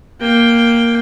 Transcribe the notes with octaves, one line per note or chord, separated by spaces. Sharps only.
A#3 G5